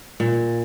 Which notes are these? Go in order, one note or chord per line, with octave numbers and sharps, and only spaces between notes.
A#2